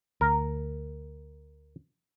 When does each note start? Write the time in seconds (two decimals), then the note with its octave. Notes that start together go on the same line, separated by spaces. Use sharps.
0.21 D2 A#4